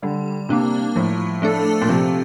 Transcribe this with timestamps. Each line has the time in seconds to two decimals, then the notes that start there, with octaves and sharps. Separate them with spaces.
0.02 D3 G3
0.49 C3 A#3 D4
0.96 A2 F3
1.42 A3 D4 A4
1.81 A#2
1.89 C3 F3